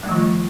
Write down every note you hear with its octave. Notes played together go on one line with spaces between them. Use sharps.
D#3 F3 G3 A3 F4